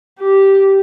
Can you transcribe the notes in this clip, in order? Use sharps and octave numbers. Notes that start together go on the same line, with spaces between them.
G4